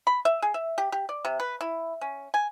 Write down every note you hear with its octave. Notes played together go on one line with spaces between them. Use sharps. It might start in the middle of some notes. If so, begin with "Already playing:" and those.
B5
E5
G#4
E5
G4
G4
D5
C3
B4
E4
C#4
G#5